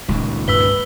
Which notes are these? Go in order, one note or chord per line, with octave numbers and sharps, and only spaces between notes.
D#1 C#2 A#2 D#3
G2 B4 E6 B6 G7